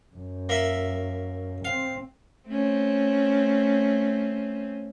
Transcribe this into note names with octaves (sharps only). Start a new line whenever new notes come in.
F#2
A#3 E5
C4 F5
A3 C4 C#4